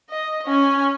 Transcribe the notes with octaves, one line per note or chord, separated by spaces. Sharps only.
D#5
C#4 G#5